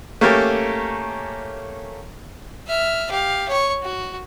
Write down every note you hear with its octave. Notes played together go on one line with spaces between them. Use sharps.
A3 A#3 C#4 G4 A4 A#4
E5 F6
G4 F5
C#5 C#6
F#4